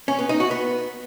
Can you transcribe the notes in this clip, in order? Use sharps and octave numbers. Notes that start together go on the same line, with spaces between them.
C#4
B3
D#4
F#4
B3